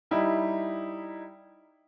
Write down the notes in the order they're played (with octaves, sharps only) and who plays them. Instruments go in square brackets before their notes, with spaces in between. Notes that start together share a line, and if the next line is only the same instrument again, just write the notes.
[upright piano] G3 D#4 E4